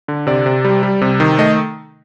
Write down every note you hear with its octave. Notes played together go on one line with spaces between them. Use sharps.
D3
C3 D5
C3
G3
G3
C3
D#3
A3 D#5